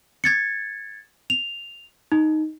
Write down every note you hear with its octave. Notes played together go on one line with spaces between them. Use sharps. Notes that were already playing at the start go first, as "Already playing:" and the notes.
G#6 A6 C#7
F7
D#4